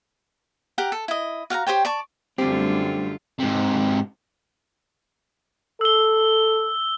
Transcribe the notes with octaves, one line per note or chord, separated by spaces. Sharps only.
G4 A#4 F#5
A4
E4 D#5
F#4 F5 G5 A#5
G4 C5 C#5 G5
D5 A5 C#6
F#2 D3 G3 A3 C4 D4 F4 G4
G#2 C3
A4 E6 G7